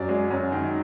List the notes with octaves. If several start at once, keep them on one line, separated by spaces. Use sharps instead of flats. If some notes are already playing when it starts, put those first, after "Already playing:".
Already playing: F#2 F#3 D5
G#3
F#2
D#3